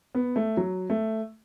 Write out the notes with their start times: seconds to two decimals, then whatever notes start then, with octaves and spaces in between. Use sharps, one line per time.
0.15 B3
0.36 A3
0.57 F#3
0.90 A3